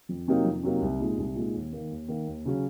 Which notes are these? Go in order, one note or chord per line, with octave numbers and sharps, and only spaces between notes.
F2
C3 F#3 A#3 D#4
F2
C3 F#3 A#3 D#4
C2
A#2 G#3 D#4
C2
A#2 G#3 D#4
D#2
D#3 A#3
D#2
D#3 A#3
D#2
C#3 F#3 C#4